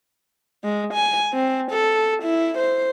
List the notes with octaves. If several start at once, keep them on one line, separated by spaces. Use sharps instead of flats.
G#3
G#5
C4
A4
E4
C5